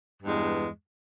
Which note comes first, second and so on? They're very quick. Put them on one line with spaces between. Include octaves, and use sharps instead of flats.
G2 G#3 E2